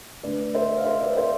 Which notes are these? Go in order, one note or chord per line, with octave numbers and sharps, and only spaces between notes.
D3 A3 D4 B4 D5
C5 E5
F5
C5 E5
B4 D5
D5
C5 E5